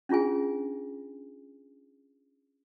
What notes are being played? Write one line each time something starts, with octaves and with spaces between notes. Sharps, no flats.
C#4 D4 F4 G#4 G#5